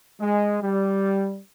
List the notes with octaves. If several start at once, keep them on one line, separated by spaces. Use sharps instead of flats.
G#3
G3